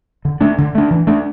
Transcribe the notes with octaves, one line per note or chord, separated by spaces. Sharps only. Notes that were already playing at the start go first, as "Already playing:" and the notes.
D3
A3 D4
D3
A3 D4
E3
A3 D4